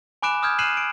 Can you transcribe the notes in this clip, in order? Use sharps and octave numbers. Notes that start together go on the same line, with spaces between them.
G#5 B5 D6 F#6 D7 E7
D#6 F6 G6 G#6
F6 F#6 C7 D#7 E7 F#7
D7